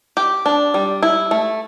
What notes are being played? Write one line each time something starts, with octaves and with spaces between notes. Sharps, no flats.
G4
D4
G3
E4
A3